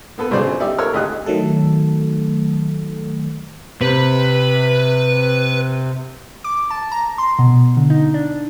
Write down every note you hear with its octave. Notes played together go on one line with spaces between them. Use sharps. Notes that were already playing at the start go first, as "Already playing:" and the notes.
A#3 B3 A4 B4
G#1 G2 C#3 F#3 C5 D5
D#4 G4 D5 E5
A4 A#4 C#5 E6 F6
G#1 D2 G4 D#5 F#6
D#3 F#3 A3 A4
C3 B4
D6
A5
A#5
C6
B2
D3
D#4
D4